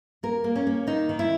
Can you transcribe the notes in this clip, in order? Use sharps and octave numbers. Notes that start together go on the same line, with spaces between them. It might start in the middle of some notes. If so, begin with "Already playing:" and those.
A#3 A#4
A#3
C#4
A#3
D#3 D#4
D#3
E4